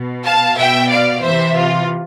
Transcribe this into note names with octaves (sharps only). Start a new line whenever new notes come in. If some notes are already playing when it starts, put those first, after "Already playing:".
Already playing: B2
F5 A5
B2 E5 G5
D5 F5
C3 E3 C5 E5
F4